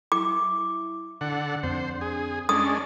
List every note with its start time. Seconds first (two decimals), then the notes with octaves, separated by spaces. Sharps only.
0.12 E4 D6
1.21 D3 F#5
1.63 F2 C4 D4 C5
2.01 G#4
2.49 G#3 C#4 D4 D#6